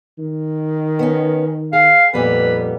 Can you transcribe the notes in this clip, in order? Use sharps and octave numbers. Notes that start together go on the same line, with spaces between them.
D#3
B3 C#4
G#4 F5
F2 A#2 G3 B3 B4